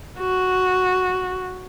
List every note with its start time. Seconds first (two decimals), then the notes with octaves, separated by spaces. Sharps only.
0.20 F#4